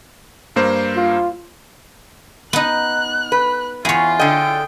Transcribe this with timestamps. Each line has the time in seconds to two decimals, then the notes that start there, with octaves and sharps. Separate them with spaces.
0.56 G2 A#3 C5
0.97 F4
2.53 B3 D#4 F#6
3.32 B4
3.85 E2 F4 G#4 C#5
4.20 D3 D#5 G5